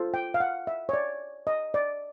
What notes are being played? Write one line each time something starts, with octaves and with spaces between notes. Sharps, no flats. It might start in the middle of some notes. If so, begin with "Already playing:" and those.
Already playing: F4 A4 C5
G5
F5
F#5
E5
C#5
D5
D#5
D5